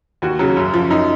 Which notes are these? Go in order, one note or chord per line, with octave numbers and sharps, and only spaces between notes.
D#2 F#4
C#3 F#3
F#2
F3
F#2 D#4